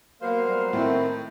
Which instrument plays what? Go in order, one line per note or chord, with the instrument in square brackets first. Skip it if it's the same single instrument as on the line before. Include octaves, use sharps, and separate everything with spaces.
[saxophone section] F#3 B3 C5 [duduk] A#3 [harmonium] A#4 F5
[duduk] G3
[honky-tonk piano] A2 [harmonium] D#3 A3 E4 [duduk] C4